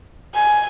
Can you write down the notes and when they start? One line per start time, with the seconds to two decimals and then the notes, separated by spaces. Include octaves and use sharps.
0.35 G#5